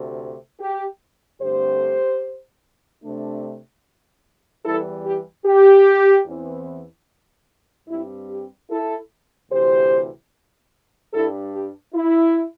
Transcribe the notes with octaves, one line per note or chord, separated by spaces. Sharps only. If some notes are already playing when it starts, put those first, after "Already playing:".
Already playing: D2 C3 A3
G4
G2 D3 A3 C4 G4 C5
C3 A3 D4
E2 E3 G3 E4 A4
G4
G4
E2 E3 C4
G2 G3 C4 E4
G4
E4 A4
D2 C3 E3 G4 C5
G2 G3 D4 E4 A4
G4
E4